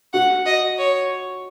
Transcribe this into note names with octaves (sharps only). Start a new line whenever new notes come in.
F#4 F#5
D#5
C#5